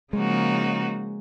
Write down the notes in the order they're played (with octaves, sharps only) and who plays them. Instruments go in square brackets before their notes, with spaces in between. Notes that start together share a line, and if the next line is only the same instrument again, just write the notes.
[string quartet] C#3 F3 A#3 D#4 F#4 [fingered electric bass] G#3